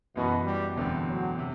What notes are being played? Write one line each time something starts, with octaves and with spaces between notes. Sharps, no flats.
F#2 B2 E3 B3 F#4
G3
E1 E2 D3 A3 C4
F#3
C3